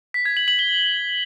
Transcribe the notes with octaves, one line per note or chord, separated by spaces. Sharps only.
B6
G#6
F#7
F#7
G7